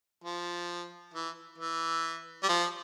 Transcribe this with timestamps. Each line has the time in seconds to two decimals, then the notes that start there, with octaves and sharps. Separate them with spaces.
0.24 F3
1.14 E3
1.58 E3
2.43 G3
2.49 F3